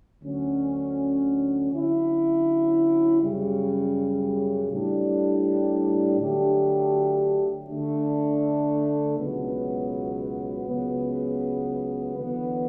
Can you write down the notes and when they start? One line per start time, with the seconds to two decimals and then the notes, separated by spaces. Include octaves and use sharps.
0.23 D2 D3 F#3 C#4
1.71 D3 F#3 C#4 E4
3.21 F#2 C#3 G3
4.70 A2 G3 D4
6.19 D3 F#3 A3 D4 G4
7.68 D3 A3 D4
9.17 C#2 B2 F#3 B3
10.67 C#2 C#3 F#3 B3
12.16 E2 D3 F#3 B3